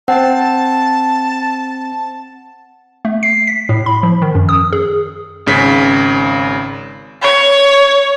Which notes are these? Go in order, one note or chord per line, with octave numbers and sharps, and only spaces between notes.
C4 F#5 A5
A3
C7
B6
A2
B5
F3
D#3
F#2
D#6
G#4
G#1 C#3 B6
C#5